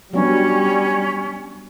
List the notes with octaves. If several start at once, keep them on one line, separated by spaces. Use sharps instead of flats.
F#3 G3 B3 C#4 D4